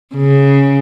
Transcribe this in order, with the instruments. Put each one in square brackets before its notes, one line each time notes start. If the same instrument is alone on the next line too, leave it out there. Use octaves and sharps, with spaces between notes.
[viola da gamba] C#3